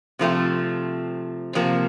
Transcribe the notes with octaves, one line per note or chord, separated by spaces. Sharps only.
C3 F3 A3 C4
C3 F3 A#3